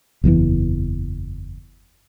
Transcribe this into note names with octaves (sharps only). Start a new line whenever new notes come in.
F#1 E2 A2 E3